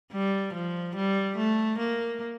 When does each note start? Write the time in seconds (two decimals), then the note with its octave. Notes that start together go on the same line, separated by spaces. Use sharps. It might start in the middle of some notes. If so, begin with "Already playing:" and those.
0.12 G3
0.54 F3
0.96 G3
1.37 A3
1.79 A#3